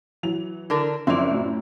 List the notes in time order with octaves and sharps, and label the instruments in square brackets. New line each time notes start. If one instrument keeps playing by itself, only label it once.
[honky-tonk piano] E3 F#3 F7
[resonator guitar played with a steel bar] D3 D4 A#4
[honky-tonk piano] F#1 F3 F7 [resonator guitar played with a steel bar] C4 E4 D5
[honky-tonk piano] F#2 A2